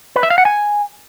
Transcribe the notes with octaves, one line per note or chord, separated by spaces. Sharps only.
B4
E5
F5
F#5
G#5